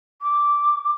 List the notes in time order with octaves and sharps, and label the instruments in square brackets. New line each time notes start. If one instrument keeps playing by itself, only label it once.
[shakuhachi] D6